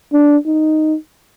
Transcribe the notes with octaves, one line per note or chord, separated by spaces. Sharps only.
D4
D#4